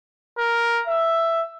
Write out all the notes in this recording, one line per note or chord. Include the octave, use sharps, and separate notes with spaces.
A#4
E5